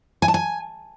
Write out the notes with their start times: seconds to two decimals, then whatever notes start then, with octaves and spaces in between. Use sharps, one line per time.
0.22 G#5
0.28 A5
0.34 G#5